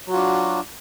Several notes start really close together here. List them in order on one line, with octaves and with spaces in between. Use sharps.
F#3 F#4 F4 D4